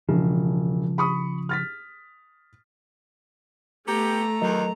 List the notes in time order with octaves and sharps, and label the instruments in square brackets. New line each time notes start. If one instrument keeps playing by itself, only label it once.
[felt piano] E1 [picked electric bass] C#3 F3
[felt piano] B5 C#6 D#6
F6 A6 B6
[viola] A3 [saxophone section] B3 G4 [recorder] A#5
[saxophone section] E2 D#3 [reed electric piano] F#3 A#4 D#5